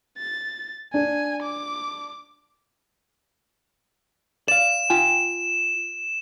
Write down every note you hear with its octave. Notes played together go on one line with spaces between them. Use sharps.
A6
D4 G#5
D6
D5 F5 E7
F4 G5 G#5